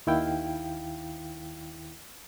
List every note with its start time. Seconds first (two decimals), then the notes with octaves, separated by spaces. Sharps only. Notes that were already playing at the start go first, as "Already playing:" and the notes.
0.07 D#2 D#3 E4 F5 G5